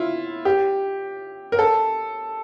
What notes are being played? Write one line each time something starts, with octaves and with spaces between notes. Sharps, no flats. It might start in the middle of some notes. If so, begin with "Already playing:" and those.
Already playing: E4 F4
G4
A#4
A4